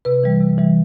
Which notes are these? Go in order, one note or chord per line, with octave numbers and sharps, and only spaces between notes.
C3 B4
E3 G3
C3
E3 G3